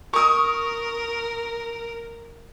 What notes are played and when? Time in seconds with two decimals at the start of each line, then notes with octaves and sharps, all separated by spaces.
0.14 A#4 C#6 D#6